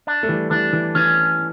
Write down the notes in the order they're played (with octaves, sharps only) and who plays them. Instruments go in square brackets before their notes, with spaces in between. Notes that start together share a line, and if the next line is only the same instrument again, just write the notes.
[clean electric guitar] D4
[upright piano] A3
E3 G3
[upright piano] E3 G3 [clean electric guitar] D4
[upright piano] E3
[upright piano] E3 [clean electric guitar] C#4